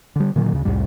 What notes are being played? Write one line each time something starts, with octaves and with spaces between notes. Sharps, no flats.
D3 G3
A#2 D3 D#3 F#3
D2 C#3
C2 F2 A2 G3